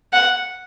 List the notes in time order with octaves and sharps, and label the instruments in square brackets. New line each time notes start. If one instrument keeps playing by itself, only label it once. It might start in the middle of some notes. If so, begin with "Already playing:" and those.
[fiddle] F#5